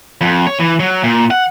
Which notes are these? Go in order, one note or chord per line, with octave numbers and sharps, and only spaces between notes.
F2
C#5
E3
F#3
A#2
F#5